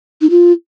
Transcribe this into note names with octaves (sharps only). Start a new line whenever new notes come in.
D#4
F4